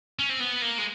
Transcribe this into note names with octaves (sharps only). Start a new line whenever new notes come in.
C#4
C4
B3
A#3
G#3